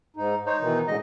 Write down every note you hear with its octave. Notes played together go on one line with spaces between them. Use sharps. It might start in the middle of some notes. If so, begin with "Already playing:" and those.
G#2 D#4
D#4 C5 C#5
B2 D#3 E3
A2 D3 G#3 D#5